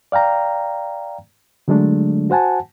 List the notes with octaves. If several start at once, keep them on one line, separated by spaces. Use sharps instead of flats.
D5 F5 G5 A#5
D3 F#3 G#3 A3 D4
F#4 C5 F#5 G#5 A5